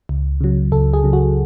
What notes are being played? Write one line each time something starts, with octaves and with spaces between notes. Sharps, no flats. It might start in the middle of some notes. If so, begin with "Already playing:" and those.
C#2
C#3 F#3
C#2 A4
G#4
C#3 F#3
F#4